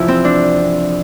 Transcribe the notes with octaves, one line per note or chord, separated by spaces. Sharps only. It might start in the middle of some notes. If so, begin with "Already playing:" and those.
Already playing: E2 C3 F3 E4
C4
D4